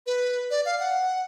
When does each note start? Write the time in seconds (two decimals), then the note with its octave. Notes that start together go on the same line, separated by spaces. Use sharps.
0.06 B4
0.51 D5
0.65 F5
0.80 F#5